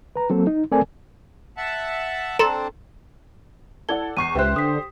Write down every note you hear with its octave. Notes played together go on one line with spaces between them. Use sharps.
B4 A#5
F#3 A#3 C4 A4
D#4
A3 C4 A4 A#4 D5 G#5
E5 F#5 A5
C4 D4 A4 A#5 C6
E4 A4 D5 F#5 G#6 G7
E2 C#6 C7 D#7
C#2 G4 B4 C5 E5 F#6
D3 D#6 B6